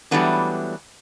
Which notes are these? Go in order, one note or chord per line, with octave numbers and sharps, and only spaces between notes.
E3 F#3 G3 A3 B3 D4